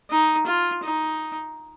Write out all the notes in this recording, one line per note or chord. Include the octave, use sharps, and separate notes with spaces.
D#4
F4
D#4